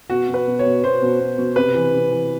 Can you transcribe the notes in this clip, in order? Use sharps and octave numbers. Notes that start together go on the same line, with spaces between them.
B2 F#4
B2
B4
B2
C#5
B2
B2 C5
B2
B2
B2
C3 B4
E3
C3
E3